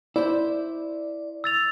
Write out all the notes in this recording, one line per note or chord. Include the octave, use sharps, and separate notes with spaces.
E4 C5 D5
E6 A6 F7